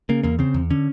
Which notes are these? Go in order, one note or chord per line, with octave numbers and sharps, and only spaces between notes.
C#3 A#3
E2 A#3
C#3 C4
E2
D3 C#4